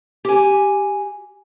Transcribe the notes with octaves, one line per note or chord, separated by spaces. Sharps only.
G4 G#5